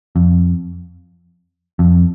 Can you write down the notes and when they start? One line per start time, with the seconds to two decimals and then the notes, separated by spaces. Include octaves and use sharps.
0.16 F2
1.79 F2